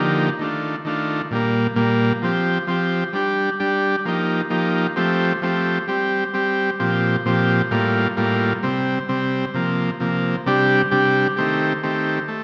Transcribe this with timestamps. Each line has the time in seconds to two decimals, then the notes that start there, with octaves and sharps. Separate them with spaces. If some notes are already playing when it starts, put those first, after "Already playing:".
Already playing: D3 F3 A#3 D#4 G4
0.39 D#3 A3 D4 F4
0.85 D#3 A3 D4 F4
1.31 A#2 G3 A#3
1.76 A#2 G3 A#3
2.22 F3 C4 G4
2.67 F3 C4 G4
3.13 G3 D4 G4
3.60 G3 D4 G4
4.05 F3 A#3 D#4 G4
4.50 F3 A#3 D#4 G4
4.96 F3 A3 C4 G4
5.42 F3 A3 C4 G4
5.87 G3 C4 G4
6.34 G3 C4 G4
6.80 A#2 F3 C4 G4
7.25 A#2 F3 C4 G4
7.71 A2 G3 A#3 F4
8.17 A2 G3 A#3 F4
8.63 C3 G3 C4
9.09 C3 G3 C4
9.54 C3 F3 A#3
10.00 C3 F3 A#3
10.46 C3 G3 D4 G4
10.91 C3 G3 D4 G4
11.37 D#3 A3 C4 G4
11.83 D#3 A3 C4 G4
12.28 A3